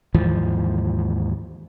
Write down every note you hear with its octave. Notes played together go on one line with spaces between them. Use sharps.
D#2 G#2 E3 F3